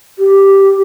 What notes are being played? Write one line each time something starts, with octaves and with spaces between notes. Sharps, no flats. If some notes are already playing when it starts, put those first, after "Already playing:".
G4